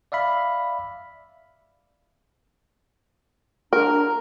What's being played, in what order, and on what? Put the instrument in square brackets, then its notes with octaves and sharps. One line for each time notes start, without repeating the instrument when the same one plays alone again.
[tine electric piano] D5 E5 F5 B5
[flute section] D4 A#5 [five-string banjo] A#4